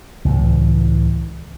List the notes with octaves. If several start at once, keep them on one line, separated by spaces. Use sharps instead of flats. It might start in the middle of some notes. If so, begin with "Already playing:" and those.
C#2 A2 E3